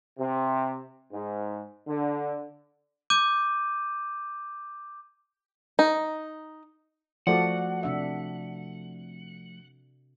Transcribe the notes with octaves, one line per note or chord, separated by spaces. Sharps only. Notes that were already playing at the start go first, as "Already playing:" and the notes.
C3
G#2
D3
D6 G6 D#7
D#4
F3 A3 F#4 A4 D5 F#5
C3 D4 E5